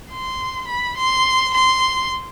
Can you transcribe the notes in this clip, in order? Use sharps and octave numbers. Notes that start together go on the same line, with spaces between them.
C6
B5
C6
C6